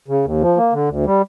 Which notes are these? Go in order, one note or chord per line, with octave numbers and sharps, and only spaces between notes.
C#3
D#2
F3
A#3
D3
D2
G3